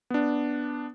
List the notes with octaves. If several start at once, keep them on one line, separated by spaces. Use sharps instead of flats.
B3 D4